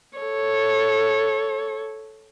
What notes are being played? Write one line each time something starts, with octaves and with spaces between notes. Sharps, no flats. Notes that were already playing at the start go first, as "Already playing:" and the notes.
A4 C#5